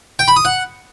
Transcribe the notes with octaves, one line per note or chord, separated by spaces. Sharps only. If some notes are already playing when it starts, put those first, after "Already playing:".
G5
B5
D#6
F#5